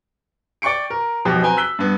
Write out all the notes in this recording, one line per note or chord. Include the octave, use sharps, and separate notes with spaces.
D5 G5 C#6 C#7 D7
A#4
B1 B2 F3 G4
C4 B4 G5 G#5 A#5
E6 F#6 B6 G7
G2 B3